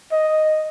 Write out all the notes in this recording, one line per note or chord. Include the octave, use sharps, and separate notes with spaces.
D#5